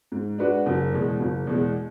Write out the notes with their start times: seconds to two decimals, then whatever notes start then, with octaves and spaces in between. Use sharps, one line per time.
0.12 G#2
0.38 G#3 D4 F#4 B4
0.66 F#1
0.93 E2 B2 G#3
1.20 F#1
1.47 E2 B2 G#3